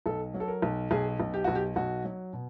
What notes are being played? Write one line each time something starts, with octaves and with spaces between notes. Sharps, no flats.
B1 A4
F#3
A4
A#4
B1
B1 G#4
B1
G4
B1 F#4
G4
B1 F#4
F#3
B2